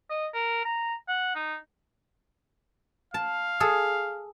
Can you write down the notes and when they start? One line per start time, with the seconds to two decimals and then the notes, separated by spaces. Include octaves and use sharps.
0.10 D#5
0.34 A#4
0.65 A#5
1.08 F#5
1.35 D#4
3.14 F5 A5
3.60 G#4 A4